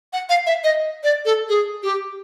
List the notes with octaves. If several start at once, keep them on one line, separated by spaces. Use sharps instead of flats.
F#5
F5
E5
D#5
D5
A4
G#4
G4